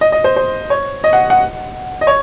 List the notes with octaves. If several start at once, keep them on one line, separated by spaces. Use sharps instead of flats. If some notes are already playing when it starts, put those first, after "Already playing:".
D#5
D#5
C5
C5
C#5
D#5
F#5
F#5
D#5
C#5